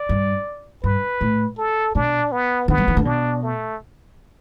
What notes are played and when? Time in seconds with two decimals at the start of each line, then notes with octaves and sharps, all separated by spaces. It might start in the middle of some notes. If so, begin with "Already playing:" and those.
Already playing: D5
0.09 G2
0.83 G2 B4
1.21 A2
1.58 A4
1.95 B2 D4
2.32 B3
2.68 D3 B3
2.78 G3
2.88 E3
2.97 D3
3.05 B2 D4
3.42 A3